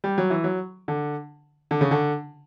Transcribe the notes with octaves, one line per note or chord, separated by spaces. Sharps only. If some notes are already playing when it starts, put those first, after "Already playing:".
G3
F#3
E3
F#3
D3
D3
C#3
D3